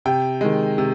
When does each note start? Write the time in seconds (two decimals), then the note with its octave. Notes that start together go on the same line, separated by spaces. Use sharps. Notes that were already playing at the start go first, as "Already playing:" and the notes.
0.05 C3 G5
0.41 D#3 G#3
0.78 C3